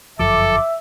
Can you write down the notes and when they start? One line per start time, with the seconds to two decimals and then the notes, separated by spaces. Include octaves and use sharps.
0.19 G1 F#2 F3 A4 E5 D6